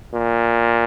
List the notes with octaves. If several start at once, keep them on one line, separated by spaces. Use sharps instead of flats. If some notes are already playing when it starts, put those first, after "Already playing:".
A#2